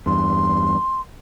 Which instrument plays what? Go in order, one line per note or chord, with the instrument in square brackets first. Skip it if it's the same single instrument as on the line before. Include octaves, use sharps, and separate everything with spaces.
[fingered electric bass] E2 G2 [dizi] C6